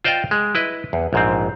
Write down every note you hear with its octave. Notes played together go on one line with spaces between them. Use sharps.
F4 C5 D5 D#5 F5 G5
G#3
E4 B4 D#5
E2
A#1 G#2 C4